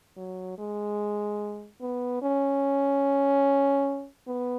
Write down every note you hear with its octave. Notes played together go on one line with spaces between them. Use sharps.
F#3
G#3
B3
C#4
B3